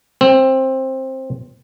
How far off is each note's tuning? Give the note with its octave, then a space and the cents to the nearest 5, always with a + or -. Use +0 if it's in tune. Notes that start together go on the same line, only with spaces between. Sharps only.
C4 +15